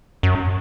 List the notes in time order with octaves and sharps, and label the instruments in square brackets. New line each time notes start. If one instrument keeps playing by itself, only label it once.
[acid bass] F#2